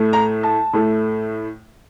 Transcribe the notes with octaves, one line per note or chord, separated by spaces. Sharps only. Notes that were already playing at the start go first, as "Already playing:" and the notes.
Already playing: A2 A3
A#5
A5
A2 A3